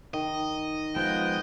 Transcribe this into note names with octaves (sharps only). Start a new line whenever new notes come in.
D#3 D#5
F3 G#3 B3 G5